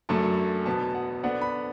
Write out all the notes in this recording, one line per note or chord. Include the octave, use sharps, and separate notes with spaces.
F#2 D3 F#3 A3 A5
E2 B2 B3 A5
F#5
D3 B3 D4 F#5
B5